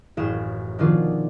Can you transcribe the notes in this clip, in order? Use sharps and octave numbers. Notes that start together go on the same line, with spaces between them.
A1 F#2 G#4 F5 G5 E7
B2 D#3 F3 D4 F4 G#4